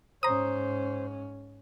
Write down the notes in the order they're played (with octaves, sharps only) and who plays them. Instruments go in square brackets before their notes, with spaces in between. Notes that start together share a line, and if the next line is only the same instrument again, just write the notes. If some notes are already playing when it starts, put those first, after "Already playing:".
[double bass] G#2 C#4 [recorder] C5 [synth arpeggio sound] A#5 D#6